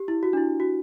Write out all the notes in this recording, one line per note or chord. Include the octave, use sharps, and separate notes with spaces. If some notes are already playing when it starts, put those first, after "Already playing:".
Already playing: G4
E4
F#4
D4
E4
F#4